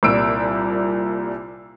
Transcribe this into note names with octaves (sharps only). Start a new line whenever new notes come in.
C2 A#2 G3 E6 D7